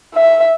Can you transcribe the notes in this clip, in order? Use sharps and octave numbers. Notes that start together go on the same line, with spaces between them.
E5